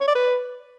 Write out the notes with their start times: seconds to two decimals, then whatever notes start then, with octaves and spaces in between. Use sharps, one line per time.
0.01 C#5
0.08 D5
0.15 B4